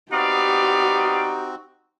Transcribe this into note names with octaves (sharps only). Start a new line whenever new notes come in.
B3 C4 D#4 F#4 G4 D5 F5